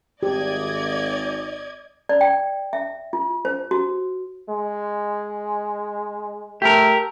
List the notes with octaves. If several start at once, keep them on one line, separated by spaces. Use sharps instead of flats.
G#1 G4 D5 D#5 G#6
D5
G5
E5
F4
C5
F#4
G#3
A3 G4 A#4